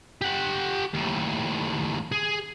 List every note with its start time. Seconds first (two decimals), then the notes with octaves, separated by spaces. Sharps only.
0.21 G4 F#5
0.93 D#2 A2
2.12 G#4